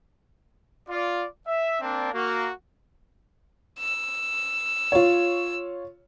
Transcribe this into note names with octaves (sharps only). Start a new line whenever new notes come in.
F4 D5
E5
A#3 C4 D4
A#3 F#4
E6
F4 C#5